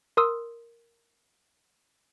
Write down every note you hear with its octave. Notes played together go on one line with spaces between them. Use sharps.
A#4 C6 D#6 E6